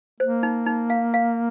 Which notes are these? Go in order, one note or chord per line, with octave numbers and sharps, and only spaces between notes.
A#3 C5
D#4
D#4
F5
F5